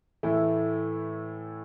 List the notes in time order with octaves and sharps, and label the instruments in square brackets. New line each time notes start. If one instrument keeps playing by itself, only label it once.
[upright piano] A2 E3 A3 E4